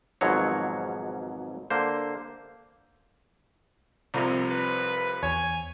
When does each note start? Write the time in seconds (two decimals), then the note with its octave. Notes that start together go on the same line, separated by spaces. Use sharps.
0.21 G#1 G#2 B2 F3 F#3 C#5
1.70 D3 A#3 C5
4.14 C2 F2 C3
4.51 B4
5.23 E2 C#5 G#5